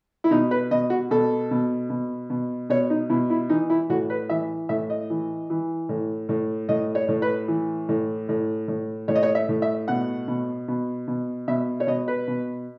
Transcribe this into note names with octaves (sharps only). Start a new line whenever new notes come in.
E4
B2 D#4
B4
B2 D#5
F#4
B2 A4
B2
B2
B2
B2 C#5
D#4
B2 E4
E4
E3 D#4
E4
A2 F#4
B4
E3 E5
A2 E5
D#5
E3
E3
A2
A2
A2 D#5
C#5
A2
B4
E3
A2
A2
A2
A2 C#5
D#5
C#5
E5
A2
E5
B2 F#5
B2
B2
B2
B2 E5
C#5
B2 D#5
B4
B2